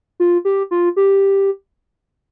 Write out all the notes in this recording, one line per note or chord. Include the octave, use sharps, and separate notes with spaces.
F4
G4
F4
G4